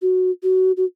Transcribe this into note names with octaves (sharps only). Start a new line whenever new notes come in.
F#4
F#4
F#4